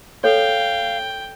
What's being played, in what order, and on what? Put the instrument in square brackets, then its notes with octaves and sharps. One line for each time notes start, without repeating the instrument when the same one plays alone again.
[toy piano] A4 C#5 [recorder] F5 [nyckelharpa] G5